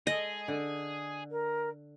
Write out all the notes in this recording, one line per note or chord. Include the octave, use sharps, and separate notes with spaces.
G#3 G#4 A4 D#5
D3
A#4